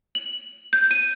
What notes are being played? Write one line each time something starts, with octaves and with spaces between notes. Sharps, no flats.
F#7
G6
D#7